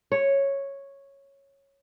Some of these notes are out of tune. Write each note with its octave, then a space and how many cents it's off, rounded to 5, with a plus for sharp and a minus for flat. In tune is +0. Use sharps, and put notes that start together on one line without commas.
C#5 -5